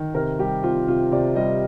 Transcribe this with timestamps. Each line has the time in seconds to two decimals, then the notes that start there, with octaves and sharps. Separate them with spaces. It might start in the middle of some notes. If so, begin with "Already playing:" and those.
Already playing: D#3
0.14 C3 A#4
0.39 G3 G4
0.63 C4 F4
0.88 C3 F4
1.11 C3 D5
1.36 G3 D#5